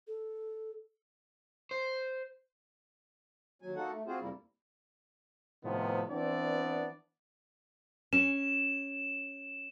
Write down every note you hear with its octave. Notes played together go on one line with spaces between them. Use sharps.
A4
C5
D#2 F#3 G#5
A#3 D#4 F#4 A4 F#5
A3
C4 F4 F#4 G#4 C5
F2 C3 G3 A#3 E4
A2 C3 D#3 F3 B3
E3 B3 C4 D4 E4 D5
C#4 E7